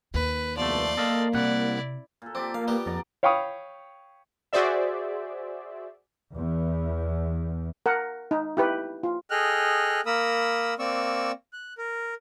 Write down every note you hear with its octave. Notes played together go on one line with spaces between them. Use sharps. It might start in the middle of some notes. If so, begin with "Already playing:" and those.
D#2 B4
C2 F3 A3 B3 D5 C6
A#3 A4 D#5 F5
C2 C3 E4 D5 F#5
A#2 A4
C4 G4 D5 D6
A#3 F5
G3 B3 G4 G5
F2 D5 F#5 A#5
C#5 F5 G5 B5 C#6 D#6
F#4 G#4 C5 D5 E5
E2
A#4 F#5
D#4
E4 G4 B4
F4
G#4 A4 D#5 G5 F6 F#6
A#3 A#4 B5 D#6 E6
A#3 C4 D5 C#6 E6
F#6
A#4